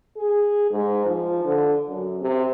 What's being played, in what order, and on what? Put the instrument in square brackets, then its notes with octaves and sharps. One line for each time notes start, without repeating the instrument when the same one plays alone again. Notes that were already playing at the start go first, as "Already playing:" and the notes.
[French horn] G#4
G#2
F3
D3
F#2
C3